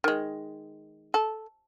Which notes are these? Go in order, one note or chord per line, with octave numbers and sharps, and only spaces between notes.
D#3 G#3
A4